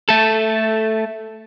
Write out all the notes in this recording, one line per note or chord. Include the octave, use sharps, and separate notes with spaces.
A3 A4